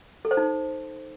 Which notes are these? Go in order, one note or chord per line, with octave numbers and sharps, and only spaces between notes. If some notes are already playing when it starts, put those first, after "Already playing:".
A4
C5
D#4